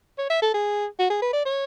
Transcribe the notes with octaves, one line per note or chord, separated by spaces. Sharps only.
C#5
E5
A4
G#4
F#4
G#4
B4
D5
C#5